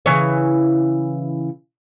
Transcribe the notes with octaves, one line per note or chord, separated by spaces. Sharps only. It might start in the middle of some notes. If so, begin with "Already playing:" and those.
C#3 E3 C#5